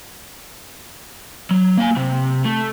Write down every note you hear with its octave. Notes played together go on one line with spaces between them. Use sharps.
F#3
A#3 G#5
C3
A3